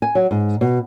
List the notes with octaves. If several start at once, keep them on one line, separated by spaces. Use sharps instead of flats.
G#5
F#3
G#2
B2